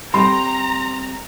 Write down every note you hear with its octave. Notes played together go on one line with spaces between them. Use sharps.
G3 C4 G5 A#5 C6